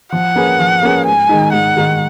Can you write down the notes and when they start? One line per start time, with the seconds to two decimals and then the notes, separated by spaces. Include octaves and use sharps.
0.12 F3 F#5
0.36 A#3 C#4 G#4 B4
0.59 F3
0.83 A#3 C#4 G#4 B4
1.06 G#2 G#5
1.29 D#3 G#3 D#4
1.53 G#2 F#5
1.77 D#3 G#3 D#4